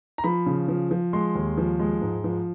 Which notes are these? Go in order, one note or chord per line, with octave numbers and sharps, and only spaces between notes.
A#5
F3 B5
C#3
F3
F3
G#3 C6
D#2
F3
G#3
G#2
F3